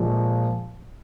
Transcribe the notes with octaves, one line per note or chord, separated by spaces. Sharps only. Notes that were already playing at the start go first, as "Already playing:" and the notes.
Already playing: A#2 F3 G#3